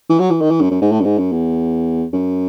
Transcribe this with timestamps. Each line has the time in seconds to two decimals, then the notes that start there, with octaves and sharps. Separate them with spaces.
0.10 E3
0.19 F#3
0.30 E3
0.41 D#3
0.51 E3
0.61 F#2
0.71 F#2
0.81 G#2
0.92 A2
1.00 F#2
1.05 G#2
1.18 F#2
1.32 E2
2.13 F#2